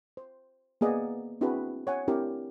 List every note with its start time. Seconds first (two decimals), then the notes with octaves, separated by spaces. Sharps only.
0.17 C5
0.81 A#3 B3 G#4 D5 D#5 F#5
1.41 C4 D4 E4 F#4 G#4 B4
1.87 C#5 F#5 G#5
2.08 C4 D4 E4 G4 A#4